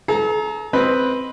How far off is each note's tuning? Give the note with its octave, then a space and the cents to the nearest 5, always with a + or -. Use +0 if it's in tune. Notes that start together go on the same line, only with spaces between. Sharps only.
A4 -45 A#5 +0
C4 +0 B4 +0 D#5 +0